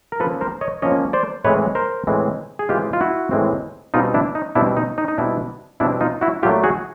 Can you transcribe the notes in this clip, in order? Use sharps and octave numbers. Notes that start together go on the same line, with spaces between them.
A#4
F3 A#3 C#4 A4 B4
A#4 C5
C#5 D#5
F3 A#3 C#4 C#5 D#5
C5 D5
A2 E3 G#3 C4 B4 C#5
A#4 C5
A2 E3 G#3 C4
G#4
A2 E3 G#3 C4 F4 G4
F4
E4 F#4
A2 E3 G#3 C4
B2 G3 C4 D#4 F4
D4 E4
D#4
B2 G3 C4 D4 E4
D#4
D#4
D#4
B2 G3 C4 D4 E4
B2 G3 C4 D4 E4
D#4 F4
E4 F#4
A#2 F#3 A3 F4 G4
F#4 G#4